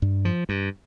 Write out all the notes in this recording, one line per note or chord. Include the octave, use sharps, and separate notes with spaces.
G2
F3
G2